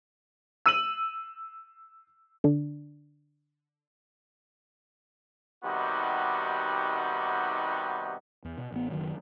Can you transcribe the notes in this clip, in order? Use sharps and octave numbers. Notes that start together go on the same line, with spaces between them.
E6 D#7 F#7
D3 D4
C3 D#3 G3 B3 D#4 F#4
E2
B2
A1 B3
F#1 D#3 F#3